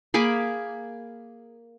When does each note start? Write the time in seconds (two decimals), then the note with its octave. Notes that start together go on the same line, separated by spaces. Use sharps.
0.14 A#3 G#4 B5 D6